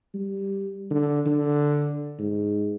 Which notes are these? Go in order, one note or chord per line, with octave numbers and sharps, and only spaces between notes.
G3
D3
D3
G#2